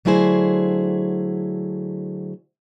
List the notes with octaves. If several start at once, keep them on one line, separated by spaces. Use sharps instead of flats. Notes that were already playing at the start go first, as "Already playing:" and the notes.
D3 F#3 A3 E4 G#4 C5